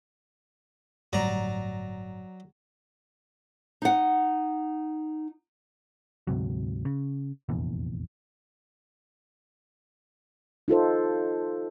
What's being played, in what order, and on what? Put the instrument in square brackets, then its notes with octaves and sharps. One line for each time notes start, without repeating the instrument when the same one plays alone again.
[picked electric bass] G1 A2 G3 [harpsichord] F#3 D5 A#5
[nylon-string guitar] D#4 F#5
[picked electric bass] D2 G#2 C3 F#3
C#3
F1 A#1 E2
[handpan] D#4 F4 A4 C5